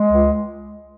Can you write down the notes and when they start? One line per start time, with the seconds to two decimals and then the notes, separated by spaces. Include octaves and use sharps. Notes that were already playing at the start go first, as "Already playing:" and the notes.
Already playing: G#3
0.10 C#2